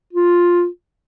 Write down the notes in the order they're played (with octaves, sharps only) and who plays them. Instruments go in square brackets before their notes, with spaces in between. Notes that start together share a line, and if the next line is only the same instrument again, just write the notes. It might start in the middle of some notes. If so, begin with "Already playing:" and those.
[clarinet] F4